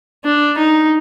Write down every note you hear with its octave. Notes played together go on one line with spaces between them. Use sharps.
D4
D#4